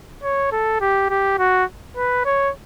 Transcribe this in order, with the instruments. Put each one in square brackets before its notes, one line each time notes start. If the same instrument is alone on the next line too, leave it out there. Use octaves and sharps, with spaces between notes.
[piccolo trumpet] C#5
A4
G4
G4
F#4
B4
C#5